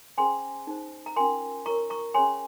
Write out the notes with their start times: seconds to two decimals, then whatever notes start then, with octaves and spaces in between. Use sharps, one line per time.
0.18 C#4 G#4 C5 G#5 C6
0.67 D#4 G#4 C5
1.06 A#5
1.16 C#4 F4 A#4 G#5 C6
1.66 F4 A#4 C#5 A#5 C#6
1.90 A#5 C#6
2.14 C#4 G#4 C#5 G#5 C6